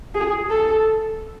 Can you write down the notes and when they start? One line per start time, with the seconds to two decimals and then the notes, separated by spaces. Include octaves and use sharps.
0.15 G#4
0.50 A4